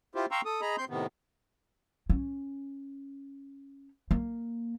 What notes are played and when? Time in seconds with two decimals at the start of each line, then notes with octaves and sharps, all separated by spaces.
0.15 E4 F4 G4 C5
0.31 F5 G5 A#5 C6 C#6 E6
0.45 A4 D#6
0.61 G#4 D#5 A#5 B5
0.78 C4 C6 G6
0.89 A2 C3 D#3 B3
2.10 C#4
4.11 A#3